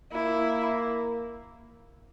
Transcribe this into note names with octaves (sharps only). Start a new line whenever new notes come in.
A#3 E4